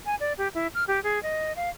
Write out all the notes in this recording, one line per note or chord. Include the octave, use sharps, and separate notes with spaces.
G#5
D5
G4
E4
F6
G4
G#4
D#5
F5